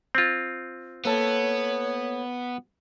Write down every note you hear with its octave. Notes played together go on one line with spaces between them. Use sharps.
C4 F4
A#3 B3 A4 C#5 A5